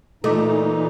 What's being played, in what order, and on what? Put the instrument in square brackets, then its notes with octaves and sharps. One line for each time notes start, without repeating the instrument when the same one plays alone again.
[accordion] A#2 E3 D#4 [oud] A3 [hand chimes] A4 D#5 D6